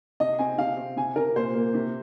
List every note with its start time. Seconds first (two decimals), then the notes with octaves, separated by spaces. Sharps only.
0.20 C3 D#5
0.39 C4 G#5
0.58 C3 F5
0.77 C4
0.97 C3 G#5
1.16 C3 A#4
1.36 A#2 C5
1.55 A#3
1.74 C3